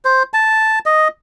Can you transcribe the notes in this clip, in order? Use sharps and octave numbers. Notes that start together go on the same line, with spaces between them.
C5
A5
D#5